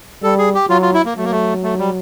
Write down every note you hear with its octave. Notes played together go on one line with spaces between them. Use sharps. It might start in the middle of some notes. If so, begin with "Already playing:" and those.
G3 A4
G#4
G4
F#3 F4
F4
E4
A#3
F#3 A3
A#3
A3
A3
G3